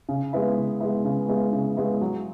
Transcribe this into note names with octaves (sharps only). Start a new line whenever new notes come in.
C#3
G#3 B3 E4
C#3
G#3 B3 E4
C#3
G#3 B3 E4
C#3
G#3 B3 E4
F#3